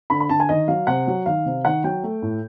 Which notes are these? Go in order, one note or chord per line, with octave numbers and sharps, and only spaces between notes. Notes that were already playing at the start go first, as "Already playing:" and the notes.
D3 B5
B5
D3 A5
G#5
D#3 D#5
F#3 F5
C3 F#5
F#3
D#3 F5
C3
D#3 F#5
F#3 G5
A3
A2